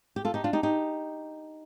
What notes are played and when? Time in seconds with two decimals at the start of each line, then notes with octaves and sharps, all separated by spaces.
0.16 G4
0.25 F4 A4
0.34 D#4 G4
0.44 D4 F4
0.53 D#4 G4
0.63 D#4 G4